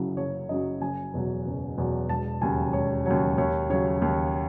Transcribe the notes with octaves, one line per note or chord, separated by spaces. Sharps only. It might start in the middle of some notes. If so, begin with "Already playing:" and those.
Already playing: F#1 F#2 C#3 F#3 E4
F#1 C#5
F#2 C#3 F#3 D#5
F#1 G#5
E2 B2 F#3
F#1
E2 B2 F#3
E1 A5
D#2 C#3 F#3 G#5
E1 C#5
D#2 C#3 F#3 C#5
D#2 C#5
C#3 F#3 C#5
D#2